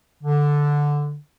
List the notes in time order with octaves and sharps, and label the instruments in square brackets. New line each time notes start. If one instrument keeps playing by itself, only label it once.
[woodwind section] D3